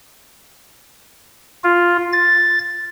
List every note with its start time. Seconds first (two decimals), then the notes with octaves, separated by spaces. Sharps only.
1.64 F4
2.13 A6